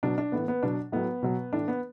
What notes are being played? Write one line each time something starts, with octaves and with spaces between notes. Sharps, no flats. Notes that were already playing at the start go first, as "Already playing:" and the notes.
B2 F#3 D4
D4
A2 E3 B3
B3
B2 F#3 D4
A2 F#3 B3
B2 F#3
A2 E3 D4
B3